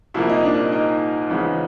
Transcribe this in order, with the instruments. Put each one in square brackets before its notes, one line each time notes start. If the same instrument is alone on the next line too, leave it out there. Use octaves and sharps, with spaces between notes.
[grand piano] C2 A#2 F3 A#3 E4
D#4
D4
D#4
D#4
E2 C#3 F3 G#3